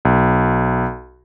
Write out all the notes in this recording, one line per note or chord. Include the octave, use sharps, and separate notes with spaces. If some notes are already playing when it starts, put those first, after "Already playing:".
B1